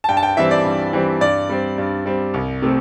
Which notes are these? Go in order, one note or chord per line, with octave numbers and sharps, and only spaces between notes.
A5
G2 G5
A5
G5
E3 G3 C4 E5
D5
G2
E3 G3 C4
G2 D5
G3 C4
G2
G3 C4
C2
C3 A3 C4